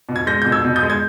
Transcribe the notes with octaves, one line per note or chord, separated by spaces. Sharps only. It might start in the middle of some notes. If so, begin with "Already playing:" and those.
B2
G#6
G#3 G6 A#6
B2 G6
E6 G#6
B2
D#6 G6
G#3
G#6